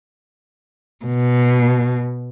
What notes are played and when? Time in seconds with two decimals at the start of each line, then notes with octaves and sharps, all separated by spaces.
1.05 B2